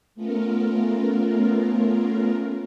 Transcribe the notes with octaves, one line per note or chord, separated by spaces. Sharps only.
A3 B3 C#4 F4 A#4